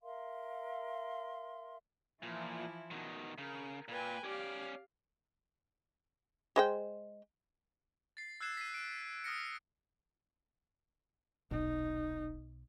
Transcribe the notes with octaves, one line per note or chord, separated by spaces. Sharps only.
A#4 E5 F5 C6
A#2 E3 F3 E4
B2 D#3
C#3 A#4
A#2 B4 G5 G#5
C#4 G4 D5 F5
G#3 C5 G5
A6 C7
E6 F#6 G#6 C7 E7
B6 C7 D#7
D7
C7
D#6 F6 A#6 C#7
D#1 B1 D#4